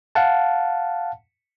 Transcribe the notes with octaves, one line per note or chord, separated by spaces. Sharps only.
F5 F#5 A5